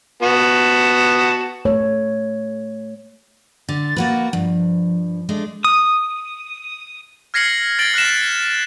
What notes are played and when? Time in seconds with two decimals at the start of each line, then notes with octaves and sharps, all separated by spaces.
0.23 B3 F#4 A5
1.65 A3 C#5
3.69 D3 A6
3.96 A#3 F#4 B4
4.33 G2 F3
5.29 G#3 A3 D4
5.64 D#6
7.34 F6 G#6 A#6 C7 C#7 F#7
7.79 G#6 A6 D7 F#7 G7
7.94 F6 F#6 A#6 B6 E7